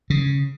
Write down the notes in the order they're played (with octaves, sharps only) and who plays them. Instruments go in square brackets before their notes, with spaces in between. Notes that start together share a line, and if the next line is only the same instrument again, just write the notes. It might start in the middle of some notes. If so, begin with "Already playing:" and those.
[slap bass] C#3